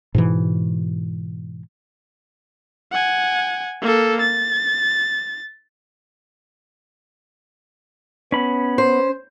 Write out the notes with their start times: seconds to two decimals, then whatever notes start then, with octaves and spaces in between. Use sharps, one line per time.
0.15 G#2 B2 E3
2.92 F#5 G#5
3.82 A#3 A4
4.21 A6
8.32 B3 C#4 B5
8.78 C5